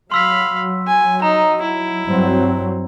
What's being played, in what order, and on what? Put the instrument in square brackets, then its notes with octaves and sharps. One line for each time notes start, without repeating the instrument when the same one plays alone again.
[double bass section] F#3 [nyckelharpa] F5 B5 [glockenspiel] C6 E6 B6
[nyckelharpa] G#5
[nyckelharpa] D#4 [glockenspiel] A#5
[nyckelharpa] E4
[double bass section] G2 F#3 C4